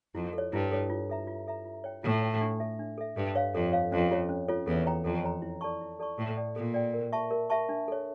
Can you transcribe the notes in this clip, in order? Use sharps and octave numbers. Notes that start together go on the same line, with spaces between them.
F2 E4
A4 C#5
G2 E4
A4 C#5
F4
A4 E5 A#5
F4
A4 E5 A#5
F4
C#5 G5
A2 F4
C#5 G5
D4
A4 E5
D4
A4 E5
G2 A4
C#5 F5
F2 A4
C#5 F5
F2 C#4
F4 A4 C#5
C#4
F4 A4 C#5
E2 A4
C#5 G5 A#5
F2 A4
C#5 G5 A#5
E4
A4 D5 A5 C#6
E4
A4 D5 A5 C#6
A2 A4
D5 G5
A#2 A4
D5 G5
A#4
E5 A5 C#6
A#4
E5 A5 C#6
D4
A4 C#5